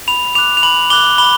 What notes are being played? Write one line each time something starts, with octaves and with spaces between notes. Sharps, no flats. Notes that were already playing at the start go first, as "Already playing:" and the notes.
B5 F7
D6 F#6 F7
F7
B5 F#7
D6 F#6 G7
B5 G7